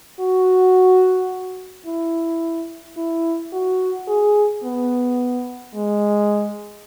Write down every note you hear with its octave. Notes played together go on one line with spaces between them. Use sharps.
F#4
E4
E4
F#4
G#4
B3
G#3